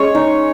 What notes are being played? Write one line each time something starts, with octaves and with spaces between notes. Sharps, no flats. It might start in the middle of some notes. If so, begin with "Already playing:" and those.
Already playing: G#3 C#4 C#5
D#4